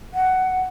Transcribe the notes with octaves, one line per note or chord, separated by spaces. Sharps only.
F#5